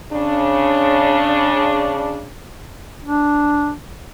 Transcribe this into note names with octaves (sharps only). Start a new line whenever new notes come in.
C#3 D4
D4